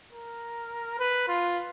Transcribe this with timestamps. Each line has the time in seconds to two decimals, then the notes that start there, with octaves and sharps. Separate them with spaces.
0.13 A#4
0.99 B4
1.28 F4